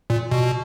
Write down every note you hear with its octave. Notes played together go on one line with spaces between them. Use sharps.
A#2
B2